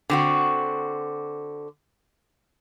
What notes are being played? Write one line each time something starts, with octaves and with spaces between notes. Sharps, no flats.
D3 C4 F#4